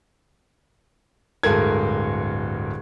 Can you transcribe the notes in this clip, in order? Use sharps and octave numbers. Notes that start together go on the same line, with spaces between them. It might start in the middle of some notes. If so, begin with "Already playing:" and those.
D1 G2 G#3 A4 A#4 G#6